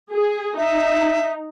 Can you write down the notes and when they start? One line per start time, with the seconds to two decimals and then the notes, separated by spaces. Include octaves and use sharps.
0.11 G#4
0.57 D#4 E5